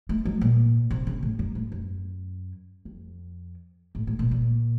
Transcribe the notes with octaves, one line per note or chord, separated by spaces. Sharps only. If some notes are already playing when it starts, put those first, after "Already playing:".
A3
F#3
A#2
C3
C#3
A2
F#2
A2
F#2
F2
A2
A2
A#2
A#2